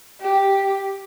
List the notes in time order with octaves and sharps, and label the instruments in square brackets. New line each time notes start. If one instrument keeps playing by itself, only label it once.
[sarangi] G4